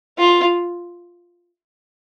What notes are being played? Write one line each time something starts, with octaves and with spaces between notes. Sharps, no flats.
F4